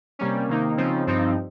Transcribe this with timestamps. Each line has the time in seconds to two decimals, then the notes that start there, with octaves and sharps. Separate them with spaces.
0.19 C3 G3 A#3 C#4
0.49 C3 D#3 A#3 D#4
0.77 C#3 F3 C4 D#4
1.07 G2 F3 C4 D#4